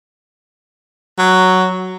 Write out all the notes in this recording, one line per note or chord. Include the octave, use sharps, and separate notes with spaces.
F#3